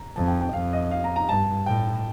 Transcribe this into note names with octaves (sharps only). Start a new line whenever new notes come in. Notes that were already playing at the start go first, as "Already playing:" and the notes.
Already playing: A#5
F2 A5
G5
G5
F2 F5
D#5
F5
A#5
A#5
G2 A5
A2 G5